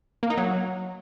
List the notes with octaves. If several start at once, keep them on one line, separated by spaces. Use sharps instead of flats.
A#3
D#4
F#3